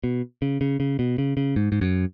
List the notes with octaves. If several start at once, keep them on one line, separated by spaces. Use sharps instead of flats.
B2
C#3
C#3
C#3
B2
C#3
C#3
G#2
G#2
F#2